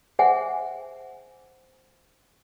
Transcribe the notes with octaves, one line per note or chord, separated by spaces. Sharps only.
G#4 C5 E5 F#5 G#5